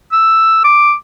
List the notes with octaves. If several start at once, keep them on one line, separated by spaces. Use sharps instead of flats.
E6
D6